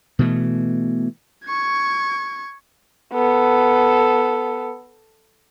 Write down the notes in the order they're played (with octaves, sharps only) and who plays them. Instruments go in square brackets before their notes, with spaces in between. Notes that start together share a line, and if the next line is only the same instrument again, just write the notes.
[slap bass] B2 E3 A3
[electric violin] C#6 G#6
[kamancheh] B3 A4